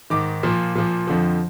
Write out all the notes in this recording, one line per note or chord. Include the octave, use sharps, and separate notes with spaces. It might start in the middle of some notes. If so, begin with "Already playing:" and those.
G#2 D#3 D6
A#2 F3
A#2 F3
F2 D3 F3